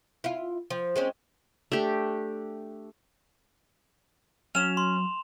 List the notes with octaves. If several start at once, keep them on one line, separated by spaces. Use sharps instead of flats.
E4 F4
F3
G#3 C4 C#4
A3 D4 G4
F#3 C#4 E7 F7
C6